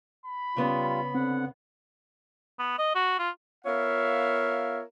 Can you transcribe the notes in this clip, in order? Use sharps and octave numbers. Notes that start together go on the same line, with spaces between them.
B5
C#3 G3 B3 F4
D3 C4 F#5
B3
D#5
F#4
F4
B3 F4 A#4 C#5 E5 F5